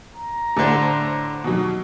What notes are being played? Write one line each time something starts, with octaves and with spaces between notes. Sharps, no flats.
A#5
A2 D3 A4 C5
B2 D#3 F#3